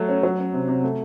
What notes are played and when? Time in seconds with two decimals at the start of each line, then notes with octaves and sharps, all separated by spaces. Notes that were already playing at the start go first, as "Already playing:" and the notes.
Already playing: F#3 A3
0.09 C#4
0.23 F#3
0.39 C#4
0.54 C3
0.68 C3
0.84 A3